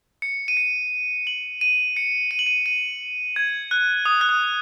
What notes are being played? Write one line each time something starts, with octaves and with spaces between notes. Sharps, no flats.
C#7
D#7
C#7
F#7
D#7
C#7
D#7
F#7
D#7
D#7
G#6
F#6
D#6
F#6
D#6